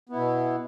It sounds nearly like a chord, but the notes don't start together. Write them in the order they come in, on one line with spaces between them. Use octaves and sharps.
B3 E4 B2